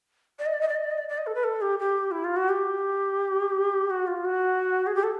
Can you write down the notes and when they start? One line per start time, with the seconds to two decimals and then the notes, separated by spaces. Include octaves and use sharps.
0.38 D5
0.46 D#5
0.53 D5
0.60 D#5
0.68 D5
0.76 D#5
0.83 D5
0.90 D#5
0.98 D5
1.08 D5
1.17 D#5
1.26 A4
1.34 B4
1.43 A4
1.61 G4
1.79 G4
2.11 E4
2.24 F4
2.36 F#4
2.49 G4
3.90 F#4
4.07 F4
4.25 F#4
4.86 G#4
4.94 G4
5.03 A4